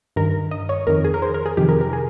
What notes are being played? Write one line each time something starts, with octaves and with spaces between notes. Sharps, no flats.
G2 D#3 A#4
D#5
C#5
F2 D#3 A#4
G#4
A#4
C5
A#4
G#4
F2 C3 D#3 G4
A#4
A#4
G#4